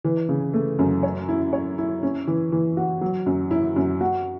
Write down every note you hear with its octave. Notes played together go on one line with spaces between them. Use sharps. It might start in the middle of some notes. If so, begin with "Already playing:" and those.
E3
C#3
A3
F#2
C#5
E4
C#5
E4
C#4
E3
E3
F#4
F#3
F#2
E4
F#2
F#4